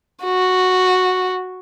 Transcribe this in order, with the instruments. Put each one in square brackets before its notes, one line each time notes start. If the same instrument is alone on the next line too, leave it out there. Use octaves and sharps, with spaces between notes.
[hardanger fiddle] F#4